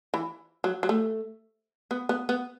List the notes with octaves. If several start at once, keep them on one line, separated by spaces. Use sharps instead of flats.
E3
F#3
F#3
A3
B3
B3
B3